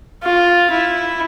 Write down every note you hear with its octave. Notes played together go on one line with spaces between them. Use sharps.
F4
E4